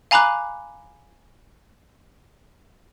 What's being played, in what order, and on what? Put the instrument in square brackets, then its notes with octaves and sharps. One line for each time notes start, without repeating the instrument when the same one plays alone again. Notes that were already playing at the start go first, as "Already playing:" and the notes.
[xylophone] F5 G#5 A#5 B5 D6 F#6